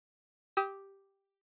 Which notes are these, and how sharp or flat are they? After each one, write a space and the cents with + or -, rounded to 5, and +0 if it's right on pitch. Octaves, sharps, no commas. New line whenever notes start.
G4 +0 D#6 +40